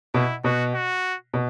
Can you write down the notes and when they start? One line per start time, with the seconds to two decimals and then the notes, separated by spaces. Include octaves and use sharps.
0.14 B2 E4
0.44 B2 F#4
0.74 F#4
1.34 B2